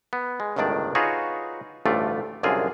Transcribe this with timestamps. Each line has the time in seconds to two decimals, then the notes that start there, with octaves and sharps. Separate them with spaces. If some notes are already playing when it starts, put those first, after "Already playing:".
0.13 B3
0.40 G#3
0.56 G1 C#2 A2 D#3 D4 D5
0.95 D#4 F4 F#4 G#4 B4 C#5
1.86 A1 D2 G2 A3 F4 D5
2.43 C2 F#2 D3 F4 G#4 A#4